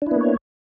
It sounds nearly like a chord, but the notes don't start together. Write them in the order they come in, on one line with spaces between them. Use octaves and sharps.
D4 E4 B3 A#3 C#5